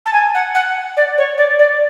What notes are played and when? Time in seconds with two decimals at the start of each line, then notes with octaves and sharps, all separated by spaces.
0.05 A5
0.13 G#5
0.34 F#5
0.54 F#5
0.96 D5
1.17 C#5
1.37 D5
1.58 D5